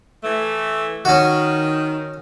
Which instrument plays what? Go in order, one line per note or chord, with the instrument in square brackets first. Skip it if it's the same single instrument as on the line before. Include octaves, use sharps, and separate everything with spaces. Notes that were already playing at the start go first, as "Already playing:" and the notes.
[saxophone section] E3 A3
[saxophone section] D#3 [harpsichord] C#4 F#4